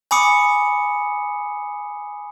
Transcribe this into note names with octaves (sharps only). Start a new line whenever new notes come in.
G#5 B5 D6 D#6 C#7